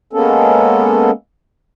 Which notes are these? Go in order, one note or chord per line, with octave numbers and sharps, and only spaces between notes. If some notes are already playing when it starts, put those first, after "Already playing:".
G#3 A#3 B3 C#4 A4